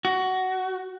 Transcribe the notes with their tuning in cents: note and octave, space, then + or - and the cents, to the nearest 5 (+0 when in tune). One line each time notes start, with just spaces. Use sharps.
F#4 +15